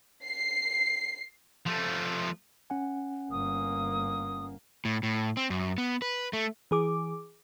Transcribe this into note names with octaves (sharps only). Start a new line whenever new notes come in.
C7
F3 A3
C#4 F#5 G#5
G1 A#3 D#6
A2
A2
C4
F#2
B3
B4
A3
E3 G#4 D6